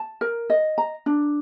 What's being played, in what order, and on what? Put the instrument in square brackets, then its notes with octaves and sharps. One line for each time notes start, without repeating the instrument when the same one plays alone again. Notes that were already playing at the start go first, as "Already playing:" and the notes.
Already playing: [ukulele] A5
A#4
D#5
A#5
D4